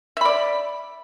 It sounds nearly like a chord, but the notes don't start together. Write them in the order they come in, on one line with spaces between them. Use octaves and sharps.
E5 B5 D5